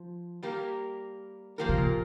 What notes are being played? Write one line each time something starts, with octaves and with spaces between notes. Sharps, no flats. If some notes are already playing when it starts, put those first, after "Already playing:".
Already playing: F3
G3 A#3 G4 A#4
F3 A#3 G4 A#4
C3
A#2